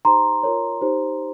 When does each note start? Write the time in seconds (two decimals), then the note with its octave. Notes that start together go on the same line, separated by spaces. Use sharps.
0.05 D#4 G4 C5 A#5 C6
0.43 F4 A#4 C#5
0.81 D#4 G4 C5